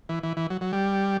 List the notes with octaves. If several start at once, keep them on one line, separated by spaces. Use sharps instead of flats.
E3
E3
E3
F#3
F#3
G3